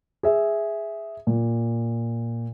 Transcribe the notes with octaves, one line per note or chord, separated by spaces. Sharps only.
G#4 E5
A#2